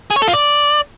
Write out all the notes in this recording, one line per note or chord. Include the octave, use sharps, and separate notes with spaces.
G#4
C#5
A4
F4
D5